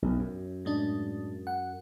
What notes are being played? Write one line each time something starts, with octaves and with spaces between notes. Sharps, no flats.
B1
F#2
A2 G#3 D4
F#5